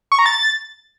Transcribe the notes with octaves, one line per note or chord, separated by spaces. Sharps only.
C#6
A#5
A6